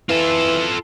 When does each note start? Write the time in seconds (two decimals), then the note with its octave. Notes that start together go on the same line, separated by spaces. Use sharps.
0.09 E3 F4 A4